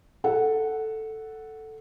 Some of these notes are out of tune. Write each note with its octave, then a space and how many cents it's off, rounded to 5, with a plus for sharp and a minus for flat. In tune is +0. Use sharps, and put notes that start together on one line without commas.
A4 +0 F#5 +0